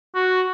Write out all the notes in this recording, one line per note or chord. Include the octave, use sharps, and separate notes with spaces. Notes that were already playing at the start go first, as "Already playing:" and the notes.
F#4